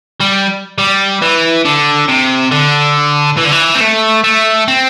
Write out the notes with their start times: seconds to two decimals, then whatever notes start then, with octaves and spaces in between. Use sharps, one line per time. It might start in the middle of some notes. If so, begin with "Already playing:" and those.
0.20 G3
0.78 G3
1.22 E3
1.65 D3
2.09 C3
2.51 D3
3.38 E3
3.46 D3
3.52 E3
3.75 C4
3.81 A3
4.24 A3
4.68 C4